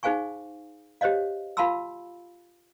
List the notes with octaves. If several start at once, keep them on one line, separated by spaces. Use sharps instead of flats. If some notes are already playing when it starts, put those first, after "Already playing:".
D#4 G#4 C5 F5 G#5 C#6
G4 C5 C#5 D#5 F5
F4 F5 A5 B5 C6 E6